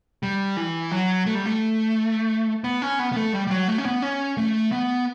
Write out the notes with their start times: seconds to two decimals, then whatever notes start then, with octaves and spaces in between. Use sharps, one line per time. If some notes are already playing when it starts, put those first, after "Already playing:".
0.23 G3
0.57 E3
0.91 F#3
1.26 A3
1.35 G3
1.46 A3
2.64 B3
2.82 C#4
2.99 B3
3.12 B3
3.16 A3
3.34 G3
3.47 G3
3.51 F#3
3.68 A3
3.78 C#4
3.86 B3
4.02 C#4
4.38 A3
4.72 B3